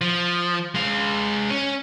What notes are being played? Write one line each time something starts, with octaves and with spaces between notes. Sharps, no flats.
F3
G#3 F5
C#4